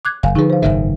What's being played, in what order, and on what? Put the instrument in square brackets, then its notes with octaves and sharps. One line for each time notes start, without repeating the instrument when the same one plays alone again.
[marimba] D6 F#6 G#6
[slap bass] F#1 [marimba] F5 G#5
[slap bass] D3 F3 [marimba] D#4 G#4 B4
[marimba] C5 F5
[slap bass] F#1 G#2 D#3 [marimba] E5